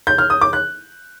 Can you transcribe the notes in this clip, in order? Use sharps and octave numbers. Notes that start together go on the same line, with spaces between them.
G6
F6
D#6
D6
F#6